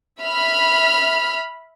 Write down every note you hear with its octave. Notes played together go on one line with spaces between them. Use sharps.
E5 B5 F6